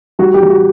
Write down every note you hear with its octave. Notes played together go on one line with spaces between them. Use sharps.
G3 F#4
G4
G3
F#4